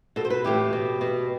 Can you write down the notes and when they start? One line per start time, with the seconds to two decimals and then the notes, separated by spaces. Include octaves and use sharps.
0.16 B2 A4
0.25 C5
0.30 B4
0.44 A2 E3 G4
0.73 B2
1.01 B2